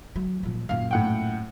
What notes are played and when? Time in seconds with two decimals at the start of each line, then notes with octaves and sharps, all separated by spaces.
0.16 F#3
0.43 A#2 F3
0.69 F#2 A#2 F5
0.91 A2 F#5 G5